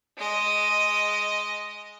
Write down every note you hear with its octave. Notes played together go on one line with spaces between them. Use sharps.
G#3 D#5